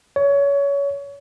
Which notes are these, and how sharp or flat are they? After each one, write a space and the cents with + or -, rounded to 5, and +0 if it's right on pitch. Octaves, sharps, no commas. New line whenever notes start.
C#5 +25